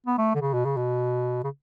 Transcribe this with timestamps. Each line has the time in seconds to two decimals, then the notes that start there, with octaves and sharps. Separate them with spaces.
0.07 B3
0.18 A3
0.35 D3
0.42 C#3
0.54 B2
0.65 C#3
0.77 B2
1.44 C#3